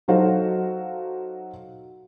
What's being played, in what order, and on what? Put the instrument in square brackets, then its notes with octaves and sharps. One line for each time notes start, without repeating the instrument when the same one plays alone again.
[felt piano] F#3 D#4 F#4 A4 C5 F5